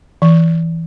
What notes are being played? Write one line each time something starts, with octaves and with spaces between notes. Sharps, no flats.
E3